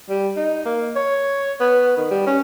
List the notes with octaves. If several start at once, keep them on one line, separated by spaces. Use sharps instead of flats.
G3
D#4
A#3
C#5
B3
D#3
G3
C#4